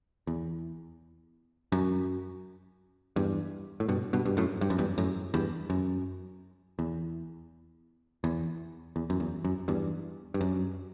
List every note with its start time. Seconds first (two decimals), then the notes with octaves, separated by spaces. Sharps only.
0.27 E2
1.72 F#2
3.16 E2 G2
3.80 A2
3.88 G2 B2
4.13 G2 B2
4.25 G2
4.37 F#2 A2
4.61 G2
4.70 F#2
4.78 E2 G2
4.98 F#2 A2
5.34 E2 G2
5.70 F#2
6.79 E2
8.24 E2
8.96 E2
9.10 F#2
9.20 E2
9.45 F#2
9.68 E2 G2
10.34 G2
10.41 F#2